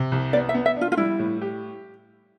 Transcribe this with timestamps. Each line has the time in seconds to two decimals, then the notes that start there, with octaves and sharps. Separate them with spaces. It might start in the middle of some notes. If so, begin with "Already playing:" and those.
Already playing: C3
0.12 C2
0.33 B3 D5
0.49 E5
0.54 B3
0.66 E5
0.76 D4 F4
0.92 F4
0.97 G3 E4
1.19 A2
1.42 G4